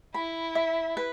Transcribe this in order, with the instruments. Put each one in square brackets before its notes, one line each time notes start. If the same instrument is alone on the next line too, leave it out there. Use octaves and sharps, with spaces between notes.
[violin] E4 [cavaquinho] B5
[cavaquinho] E5
B4